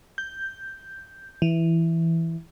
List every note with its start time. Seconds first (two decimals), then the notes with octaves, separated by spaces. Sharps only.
0.18 G6
1.42 E3